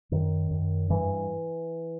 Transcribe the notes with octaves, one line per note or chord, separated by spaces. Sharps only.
F#2 D#3
F#2
G2 E3